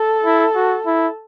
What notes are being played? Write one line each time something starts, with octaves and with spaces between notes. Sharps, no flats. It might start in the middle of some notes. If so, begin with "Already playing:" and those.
Already playing: A4
E4
F#4
E4